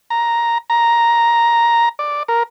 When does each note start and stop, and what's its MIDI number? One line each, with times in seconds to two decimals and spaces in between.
0.10 0.58 82
0.70 1.89 82
1.99 2.23 74
2.28 2.43 70